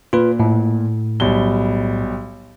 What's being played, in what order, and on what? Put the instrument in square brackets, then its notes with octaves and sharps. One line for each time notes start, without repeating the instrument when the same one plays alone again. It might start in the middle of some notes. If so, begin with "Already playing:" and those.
[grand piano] A#2 [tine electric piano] F4 B4
[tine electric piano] A2
[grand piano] B1 G3 G7